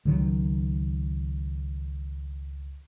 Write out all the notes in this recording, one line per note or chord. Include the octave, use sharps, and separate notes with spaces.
C#2 D#3 F#3